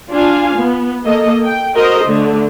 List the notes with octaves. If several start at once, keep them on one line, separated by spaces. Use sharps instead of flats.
D4 F4 F5 G#5
B3
A#3 A4 D#5
G5
F#4 A#4 C5 D#5
D3 A3